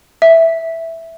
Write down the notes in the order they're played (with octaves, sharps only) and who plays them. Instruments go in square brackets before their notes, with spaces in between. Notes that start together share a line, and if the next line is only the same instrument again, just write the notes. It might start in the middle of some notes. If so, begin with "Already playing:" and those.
[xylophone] E5